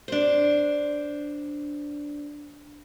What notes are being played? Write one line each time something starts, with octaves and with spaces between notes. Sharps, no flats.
D4 C5